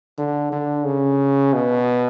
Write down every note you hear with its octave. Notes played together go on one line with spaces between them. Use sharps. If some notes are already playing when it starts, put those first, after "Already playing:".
D3
D3
C#3
B2